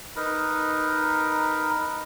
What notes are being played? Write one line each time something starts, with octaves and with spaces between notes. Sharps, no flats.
D#4 A#4 B4